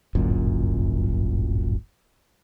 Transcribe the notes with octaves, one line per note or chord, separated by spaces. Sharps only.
D1 G1 F#2 A#2